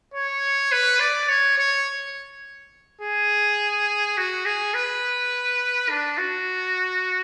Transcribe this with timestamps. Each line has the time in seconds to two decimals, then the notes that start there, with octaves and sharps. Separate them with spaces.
0.14 C#5
0.72 B4
1.00 D5
1.29 C#5
1.58 C#5
3.01 G#4
4.17 F#4
4.45 G#4
4.74 B4
5.89 D4
6.18 F#4